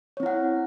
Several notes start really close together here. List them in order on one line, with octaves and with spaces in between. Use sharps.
C#5 C4 E4 F#5